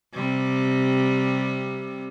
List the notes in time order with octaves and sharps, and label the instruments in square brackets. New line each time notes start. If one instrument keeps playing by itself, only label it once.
[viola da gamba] C3 G3